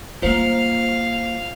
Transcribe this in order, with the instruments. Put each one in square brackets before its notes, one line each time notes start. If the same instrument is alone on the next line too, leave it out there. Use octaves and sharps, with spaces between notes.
[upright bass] G3 A#3 [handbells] F4 C5 [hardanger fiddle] F5